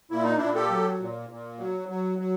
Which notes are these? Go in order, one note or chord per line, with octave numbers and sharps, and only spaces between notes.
A#2 E4
D#4
A#2 D4 E4
G4 A4
F#3
A#2
A#2
F#3
F#3
F#3